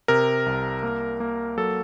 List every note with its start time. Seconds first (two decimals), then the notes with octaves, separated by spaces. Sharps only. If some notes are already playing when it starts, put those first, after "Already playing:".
0.08 C3 A#4
0.46 C2
0.83 A#3
1.20 A#3
1.57 F#3 A4